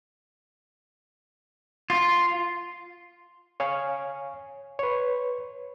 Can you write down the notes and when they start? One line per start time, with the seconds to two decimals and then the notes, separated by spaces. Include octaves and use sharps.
1.90 F4
3.60 C#5 F5 G#5
4.79 B4 C#5